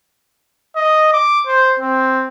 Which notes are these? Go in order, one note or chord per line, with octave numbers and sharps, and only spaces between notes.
D#5
D6
C5
C4